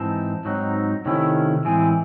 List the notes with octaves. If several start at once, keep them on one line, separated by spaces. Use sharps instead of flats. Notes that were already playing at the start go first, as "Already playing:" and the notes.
Already playing: G#2 E3 C4 D#4 A5
G#2 F#3 C4 D#4
C3 D#3 A3 C#4 E4
A2 E3 G#3 C4 G#5